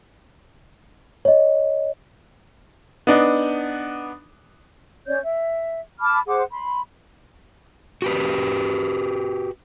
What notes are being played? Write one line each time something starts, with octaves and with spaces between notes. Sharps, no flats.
C#5 D#5
B3 D4 D#4
C#4 C#5 D5 G6
E5
A5 B5 D6 F6
G#4 C5 F#5 D6
B5 C6
F#4 G4 B4